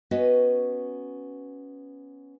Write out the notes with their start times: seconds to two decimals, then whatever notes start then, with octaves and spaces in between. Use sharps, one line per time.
0.11 B3 C#4 F#4 B4 D#5